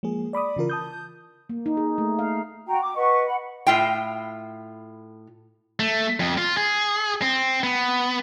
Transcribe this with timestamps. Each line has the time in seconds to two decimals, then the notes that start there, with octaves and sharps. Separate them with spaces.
0.03 F3 G#3 A#3 G#4
0.33 D5 B5 D6 D#6
0.56 C#3 E3 F4 A#4
0.70 A5 D#6 G6
1.49 A#3
1.66 D#4
1.77 G#4
1.98 A3
2.19 F5
2.67 F#4 G5 A#5
2.81 D6
2.94 B4 D#5 F#5 C#6
3.26 F#5 B5
3.67 A2 F4 G5
5.80 A3
6.20 F2
6.38 F4
6.57 G#4
7.22 C4
7.64 B3